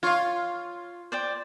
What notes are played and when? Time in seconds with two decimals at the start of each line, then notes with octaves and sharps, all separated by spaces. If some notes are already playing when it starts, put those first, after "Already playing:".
0.03 F4 C#5 F5
1.12 C5 D5 G5